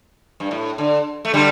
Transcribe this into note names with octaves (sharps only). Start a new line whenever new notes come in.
G2
A2
D3
A3
D3 G3